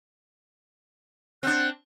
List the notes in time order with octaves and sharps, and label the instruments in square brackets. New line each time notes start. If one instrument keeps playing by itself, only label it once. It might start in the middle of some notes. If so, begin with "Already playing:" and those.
[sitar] C4 D4 [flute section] F#5 F#6 G6